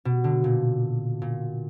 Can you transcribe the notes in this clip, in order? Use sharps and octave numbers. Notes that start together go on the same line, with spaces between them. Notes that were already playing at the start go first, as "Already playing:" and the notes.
B2
D3
A#2
A#2